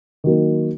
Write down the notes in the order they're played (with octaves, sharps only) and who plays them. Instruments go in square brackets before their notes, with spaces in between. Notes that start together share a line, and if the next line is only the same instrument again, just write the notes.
[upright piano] D#3 F#3 A#3